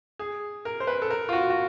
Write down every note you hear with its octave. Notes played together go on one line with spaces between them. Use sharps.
G#4
A#4
C5
B4
A4
A#4
F4
F#4
F#4